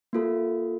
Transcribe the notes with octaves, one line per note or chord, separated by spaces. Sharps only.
A#3 F4 A4